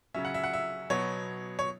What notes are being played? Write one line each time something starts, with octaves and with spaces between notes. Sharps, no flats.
C#3 F#3 C#4 E5
F#5
E5
F#5
E5
B2 F#3 B3 C#5
C#5